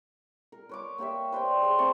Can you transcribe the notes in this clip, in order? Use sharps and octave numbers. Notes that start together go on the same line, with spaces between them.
A#4
B4 C#5 D6
A#3 G4 C#5 E5
B4 C5 D5 G5
G#4 C6
A3 C4 A5 C#6